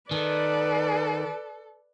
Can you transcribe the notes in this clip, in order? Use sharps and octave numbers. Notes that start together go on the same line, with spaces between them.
D#3 A4 B4 D5